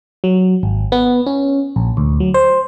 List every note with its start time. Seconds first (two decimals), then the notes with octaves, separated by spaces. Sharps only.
0.24 F#3
0.63 G#1
0.92 B3
1.26 C#4
1.76 A#1
1.97 D2
2.20 F#3
2.34 C5